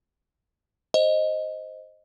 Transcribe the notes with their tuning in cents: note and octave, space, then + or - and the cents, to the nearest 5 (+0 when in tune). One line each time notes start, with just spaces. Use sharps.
C5 +0 D#5 +0